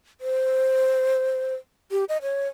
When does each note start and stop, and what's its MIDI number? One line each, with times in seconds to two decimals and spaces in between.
0.21 1.55 72
1.91 2.04 67
2.09 2.17 75
2.22 2.48 73